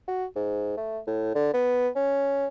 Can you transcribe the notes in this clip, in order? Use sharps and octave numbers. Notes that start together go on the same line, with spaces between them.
F#4
G#2
A3
A2
D3
B3
C#4